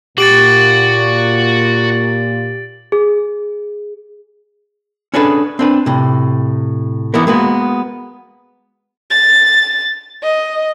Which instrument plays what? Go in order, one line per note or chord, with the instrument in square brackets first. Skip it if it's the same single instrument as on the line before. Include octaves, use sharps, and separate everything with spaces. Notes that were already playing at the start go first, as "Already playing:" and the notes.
[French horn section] A#2 [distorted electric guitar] F#4 [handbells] G4 [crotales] A6 D7 F#7
[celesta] G#4
[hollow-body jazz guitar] C#4 D4 G#4 A4 B4
C4 D4 B4
A2 C3
E3 B3 D#4 E4 A#4
G#3 A#3 B3 F#4
[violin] A6
D#5